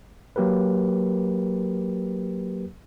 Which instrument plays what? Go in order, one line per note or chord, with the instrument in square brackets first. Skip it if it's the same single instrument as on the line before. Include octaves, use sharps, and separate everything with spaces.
[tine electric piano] F#3 A#3 G4 A#4 B4